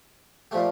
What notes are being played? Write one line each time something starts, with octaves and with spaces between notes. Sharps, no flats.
A#2 F3 A3 G4